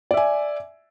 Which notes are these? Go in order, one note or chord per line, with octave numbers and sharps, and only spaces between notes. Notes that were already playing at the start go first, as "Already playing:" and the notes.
D5 E5 G#5